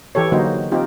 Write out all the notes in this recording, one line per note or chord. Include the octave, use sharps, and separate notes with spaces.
E3 G4 A4 C#5
D3 F#3 A#3 D#4 F#4 C5
C4 D#4 F4 G4